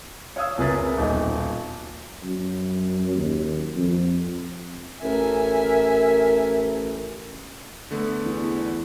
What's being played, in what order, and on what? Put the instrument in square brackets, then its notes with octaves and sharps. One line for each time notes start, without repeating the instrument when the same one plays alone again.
[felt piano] C#5 F5 D#6 E6
C#2 C3 G#4 A#4 B4 A6
D#1 B1 D#5
[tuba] F#2
D#2
F2
[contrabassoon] A1 [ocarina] A#4 [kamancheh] E5 G#5
[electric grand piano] D3 A3 B3
[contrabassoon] E2